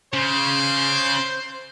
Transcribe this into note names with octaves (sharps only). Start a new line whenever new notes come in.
C#3 C5